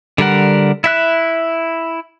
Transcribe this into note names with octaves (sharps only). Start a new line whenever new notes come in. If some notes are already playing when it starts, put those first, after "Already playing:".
D3 G3 A#4 F#5
E4 E5 F#6